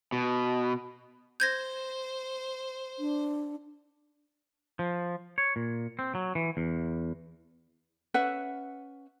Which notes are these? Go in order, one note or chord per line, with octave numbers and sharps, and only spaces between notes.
B2
C5 G6 G#6 A#6
D4
F3
C#5
A#2
C4
F#3
E3
E2
C#4 B4 E5 F#5